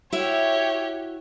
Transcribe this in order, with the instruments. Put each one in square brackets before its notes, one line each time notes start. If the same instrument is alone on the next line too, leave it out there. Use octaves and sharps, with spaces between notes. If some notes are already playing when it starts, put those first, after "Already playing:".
[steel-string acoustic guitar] E4 F#4 E5 [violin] G4 C#5